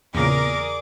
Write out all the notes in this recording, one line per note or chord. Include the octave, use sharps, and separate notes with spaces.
E2 A#2 C#3 G#4 A#4 D5 D6